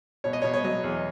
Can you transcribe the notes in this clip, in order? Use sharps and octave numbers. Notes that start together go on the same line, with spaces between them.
B2 C#5
D#5
B2 C#5
C#5
F#3 D#5
E2